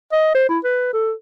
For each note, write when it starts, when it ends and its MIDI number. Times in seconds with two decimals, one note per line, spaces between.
0.12 0.33 75
0.35 0.45 72
0.49 0.59 64
0.64 0.90 71
0.93 1.13 69